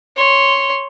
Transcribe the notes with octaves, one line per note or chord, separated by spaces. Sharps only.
C#5 C6